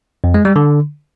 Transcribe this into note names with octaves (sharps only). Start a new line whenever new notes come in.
F2
G#3
G3
D3